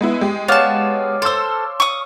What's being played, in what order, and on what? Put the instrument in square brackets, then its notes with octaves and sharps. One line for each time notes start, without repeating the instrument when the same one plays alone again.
[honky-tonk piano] G#3 B3 E4
G#3 G4
[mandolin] B3 A5 [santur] C#5 D5 F5
[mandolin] A4 C5 [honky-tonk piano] C6 E6
[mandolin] C#6 D#6